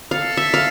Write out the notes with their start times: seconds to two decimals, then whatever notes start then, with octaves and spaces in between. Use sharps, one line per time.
0.11 A4 F5
0.37 E5
0.54 F5